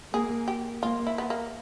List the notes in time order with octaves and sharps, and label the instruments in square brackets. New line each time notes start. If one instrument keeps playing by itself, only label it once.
[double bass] A#3 [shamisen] G#4
[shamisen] G4
[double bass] A#3 [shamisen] F4
[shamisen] E4
B3
A#3